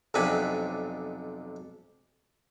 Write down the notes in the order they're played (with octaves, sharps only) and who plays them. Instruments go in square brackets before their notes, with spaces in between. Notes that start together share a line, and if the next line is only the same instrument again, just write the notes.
[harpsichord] B1 F2 C3 D4 G#5 B5